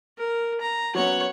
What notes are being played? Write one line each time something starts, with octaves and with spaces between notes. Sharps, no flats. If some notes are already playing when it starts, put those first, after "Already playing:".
A#4
A#5
F#3 B3 C#4 C#5 F#5